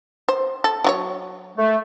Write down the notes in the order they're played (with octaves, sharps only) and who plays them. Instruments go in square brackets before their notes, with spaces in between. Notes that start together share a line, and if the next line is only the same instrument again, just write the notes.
[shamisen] C5
A4
F#3 F4 C#5
[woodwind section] A3